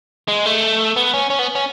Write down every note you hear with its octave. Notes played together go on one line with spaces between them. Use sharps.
G#3
A3
B3
C#4
C#4
B3
C#4